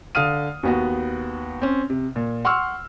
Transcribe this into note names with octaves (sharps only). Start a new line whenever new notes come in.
D3 F5 D#6 F6 D#7
D#2 B3 F#4
C4 C#4
C3
A#2
F#5 C6 C#6 E6 F6